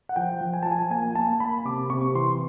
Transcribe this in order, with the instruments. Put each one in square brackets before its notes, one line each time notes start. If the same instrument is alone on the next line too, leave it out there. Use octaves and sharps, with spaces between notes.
[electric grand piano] F#5
F3 G5
F3
G#5
F3 A5
G#5
A#3 G#5
A#3 A5
A#3 B5
C3 D6
C3 C#6
E3 C6